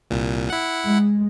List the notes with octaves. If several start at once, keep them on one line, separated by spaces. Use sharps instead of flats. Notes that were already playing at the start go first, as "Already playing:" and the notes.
C2 A#2
E4 F#5
G#3